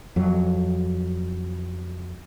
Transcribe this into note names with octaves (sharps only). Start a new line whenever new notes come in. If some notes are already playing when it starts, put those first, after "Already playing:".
F2 F#3